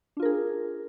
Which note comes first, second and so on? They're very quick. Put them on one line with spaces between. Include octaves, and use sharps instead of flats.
D4 F4 A#4 G#4